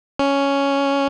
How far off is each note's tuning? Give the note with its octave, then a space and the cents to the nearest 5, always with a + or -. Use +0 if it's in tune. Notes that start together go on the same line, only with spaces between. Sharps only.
C#4 +5